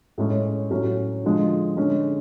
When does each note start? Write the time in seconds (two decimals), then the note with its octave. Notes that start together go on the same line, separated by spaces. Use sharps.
0.18 A2 G#3 C#4
0.70 A2 F#3 C#4
1.24 D3 F3 G#3
1.77 D3 G#3 C#4